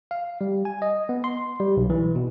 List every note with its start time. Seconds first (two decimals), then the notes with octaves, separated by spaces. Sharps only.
0.11 F5
0.41 G3
0.65 G#5
0.82 D#5
1.09 B3
1.24 C6
1.60 G3
1.77 B1
1.90 E3
2.15 B2